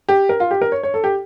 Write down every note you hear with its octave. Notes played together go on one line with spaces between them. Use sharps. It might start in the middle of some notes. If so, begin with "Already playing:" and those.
G4
A#4
F4
G4
A#4
C#5
C#5
A4
G4